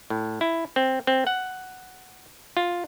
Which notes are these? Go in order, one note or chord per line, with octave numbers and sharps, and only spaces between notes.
A2
E4
C4
C4
F#5
F4